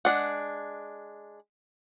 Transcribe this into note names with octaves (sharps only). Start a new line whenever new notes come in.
G#3 D4 F#5